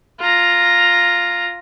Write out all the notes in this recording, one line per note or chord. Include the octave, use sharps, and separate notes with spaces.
F4 A#5